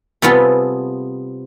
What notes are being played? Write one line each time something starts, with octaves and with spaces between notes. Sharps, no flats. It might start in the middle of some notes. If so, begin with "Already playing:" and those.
C3 G3 B3 F4 G#4 A4